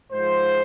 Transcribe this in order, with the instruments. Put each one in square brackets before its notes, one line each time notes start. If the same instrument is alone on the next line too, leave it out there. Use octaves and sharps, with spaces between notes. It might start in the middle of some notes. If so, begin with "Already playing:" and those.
[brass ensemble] G#2 F3 G#3 C5